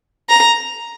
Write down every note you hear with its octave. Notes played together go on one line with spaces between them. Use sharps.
A#5